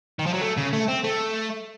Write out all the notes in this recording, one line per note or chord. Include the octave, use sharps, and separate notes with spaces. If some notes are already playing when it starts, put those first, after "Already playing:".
D#3
F3
F#3
A3
C#3
A3
C4
A3